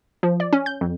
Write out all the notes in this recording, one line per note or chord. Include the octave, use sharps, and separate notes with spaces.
F3
D5
C#4
G6
F2